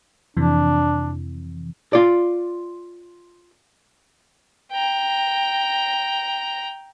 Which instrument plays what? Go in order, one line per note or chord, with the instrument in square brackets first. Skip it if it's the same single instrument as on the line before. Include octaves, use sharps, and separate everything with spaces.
[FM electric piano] F2 C3 E3 [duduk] D4
[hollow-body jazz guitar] F4 D5
[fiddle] G5 A#5